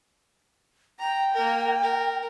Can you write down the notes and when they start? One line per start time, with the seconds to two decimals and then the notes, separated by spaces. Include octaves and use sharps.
0.99 G5 A#5
1.34 A#3 A#4
1.83 A#4